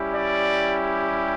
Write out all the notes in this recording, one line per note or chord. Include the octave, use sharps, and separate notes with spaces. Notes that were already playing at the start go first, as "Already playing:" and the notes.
Already playing: G3 C#4 E4 G4
D5